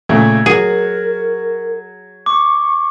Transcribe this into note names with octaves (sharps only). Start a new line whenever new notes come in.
A#2 C#3 A3 G#6
F#3 F#4 G#4 A#4
C#6 D6